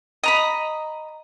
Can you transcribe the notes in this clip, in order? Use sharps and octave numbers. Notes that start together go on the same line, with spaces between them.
D#5 A#5 B5